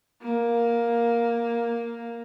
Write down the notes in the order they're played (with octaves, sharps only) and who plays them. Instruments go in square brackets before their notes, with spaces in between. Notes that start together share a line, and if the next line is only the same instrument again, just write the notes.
[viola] A#3